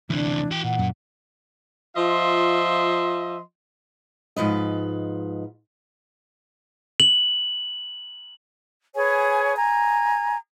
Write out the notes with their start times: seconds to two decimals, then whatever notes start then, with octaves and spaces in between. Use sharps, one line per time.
0.10 D2 C3 E3 D4
0.51 F#4 G5
0.64 A#2 F#5
0.79 F#2
1.96 F3 F4 D#5 E5 C6
4.36 G#2 F3 B4 D#5
7.00 F#7
8.95 G#4 B4 C#5 G#5
9.56 G#5 A#5